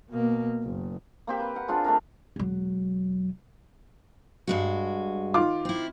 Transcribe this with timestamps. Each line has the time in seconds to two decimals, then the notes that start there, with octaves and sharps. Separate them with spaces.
0.10 B2 A#3
0.64 F#1
1.27 A#3 C4 G4
1.40 B4
1.56 A#4 F#5
1.68 C4 D4 F4 G#4
1.84 A3 D4 A#4
2.36 E1 F#3
4.47 G2 G#3 F#4
5.34 D#3 F4 D6
5.65 C4 E4